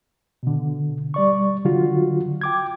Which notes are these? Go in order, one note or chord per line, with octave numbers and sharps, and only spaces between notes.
B2 D3
G3 D5 C#6
D3 F#3 F4 F#4
G5 D6 G#6